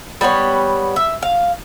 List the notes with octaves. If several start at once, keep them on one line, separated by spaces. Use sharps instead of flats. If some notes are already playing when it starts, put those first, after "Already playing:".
G3 B3 D#4 C#5
E5
F5